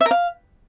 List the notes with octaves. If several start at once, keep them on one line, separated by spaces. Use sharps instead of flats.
E5
A#4
F5